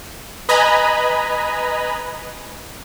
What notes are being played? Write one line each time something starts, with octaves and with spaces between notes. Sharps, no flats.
B4 D#5 G#5 A#5 B5